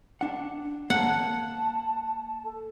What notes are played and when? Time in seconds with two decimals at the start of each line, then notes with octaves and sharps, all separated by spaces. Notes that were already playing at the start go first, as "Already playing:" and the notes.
0.21 D4 F#5
0.90 A#3 F#5 A5
2.44 A4